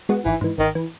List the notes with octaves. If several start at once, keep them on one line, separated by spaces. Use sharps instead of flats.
G#3 B3 F#4
G#1 E3
G#2 E3
G#1 D#3
E3